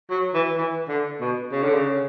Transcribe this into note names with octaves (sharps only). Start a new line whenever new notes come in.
F#3
E3
E3
D3
B2
C#3
D3
C#3